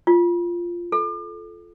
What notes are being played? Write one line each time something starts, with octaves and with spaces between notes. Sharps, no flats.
F4
A4